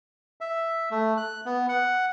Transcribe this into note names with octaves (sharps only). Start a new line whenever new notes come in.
E5
A3
F#6
B3
F#5